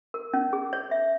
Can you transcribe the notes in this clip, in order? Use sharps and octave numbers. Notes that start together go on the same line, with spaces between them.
A#4
C#4
G#4
C#5
E5